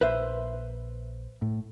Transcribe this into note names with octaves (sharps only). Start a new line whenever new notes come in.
A#1 B4 C5 E5
A2